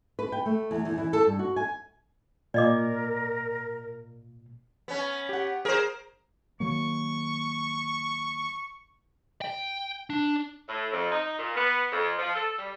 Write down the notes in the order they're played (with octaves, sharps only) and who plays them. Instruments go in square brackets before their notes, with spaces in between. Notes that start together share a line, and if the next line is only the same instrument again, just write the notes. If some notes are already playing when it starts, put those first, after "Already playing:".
[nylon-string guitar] B4
G5
A3
E2
E2
E3
A4
G2
F#4
G#5
[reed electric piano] A#2 [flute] A#4 [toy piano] D5 D#5 D6
[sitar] B3 C#4
[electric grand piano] G4 F#5
[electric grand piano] G#4 [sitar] A#4 C5
[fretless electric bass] D#3 F#3 A#3 [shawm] C#6
[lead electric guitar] G5
D4
[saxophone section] A2
F2
D#4
A#2
B3
F2
F3
A4
G3